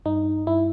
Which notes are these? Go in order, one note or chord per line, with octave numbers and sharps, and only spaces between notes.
G2 D#4
G2 E4